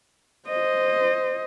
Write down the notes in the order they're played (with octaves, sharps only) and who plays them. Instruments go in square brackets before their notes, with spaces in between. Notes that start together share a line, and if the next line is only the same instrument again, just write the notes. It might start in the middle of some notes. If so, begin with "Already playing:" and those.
[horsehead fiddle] C5 D#5